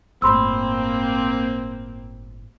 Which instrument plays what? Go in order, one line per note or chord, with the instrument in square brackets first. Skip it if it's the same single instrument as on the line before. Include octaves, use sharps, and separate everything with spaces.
[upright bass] G1 A2 [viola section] A#3 C4 [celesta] B5 C6 E6